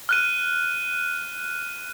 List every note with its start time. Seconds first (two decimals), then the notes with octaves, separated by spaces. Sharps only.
0.09 F6 F#6 D#7